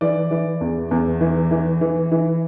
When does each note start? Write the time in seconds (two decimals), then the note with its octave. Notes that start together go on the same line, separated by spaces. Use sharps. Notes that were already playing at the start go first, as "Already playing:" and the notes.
0.01 E3 D5
0.31 E3
0.61 E2
0.91 E2
1.21 E3
1.51 E3
1.81 E3
2.12 E3